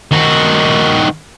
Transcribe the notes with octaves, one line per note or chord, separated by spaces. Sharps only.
D#3 F#4